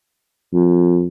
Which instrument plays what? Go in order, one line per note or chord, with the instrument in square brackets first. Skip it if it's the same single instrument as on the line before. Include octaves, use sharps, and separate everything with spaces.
[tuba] F2